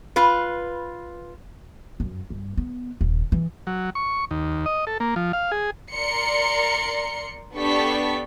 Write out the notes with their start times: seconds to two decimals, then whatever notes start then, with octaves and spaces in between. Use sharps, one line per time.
0.16 F4 B4
2.00 F#2
2.30 G2
2.57 B3
3.01 D#1
3.32 E3
3.67 F#3
3.95 C#6
4.31 D#2
4.66 D#5
4.87 A4
5.00 A#3
5.16 F3
5.33 F5
5.52 G#4
5.92 A#4 D5 C6 C#7
7.55 B3 D4 G4 A4 C#6 B6